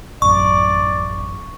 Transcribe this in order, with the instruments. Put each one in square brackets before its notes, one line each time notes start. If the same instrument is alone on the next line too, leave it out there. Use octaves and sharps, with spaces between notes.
[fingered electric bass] A1 F#2 [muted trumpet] D5 [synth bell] C#6